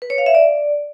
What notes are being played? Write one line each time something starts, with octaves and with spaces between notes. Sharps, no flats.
B4
C#5
F5
E5
D5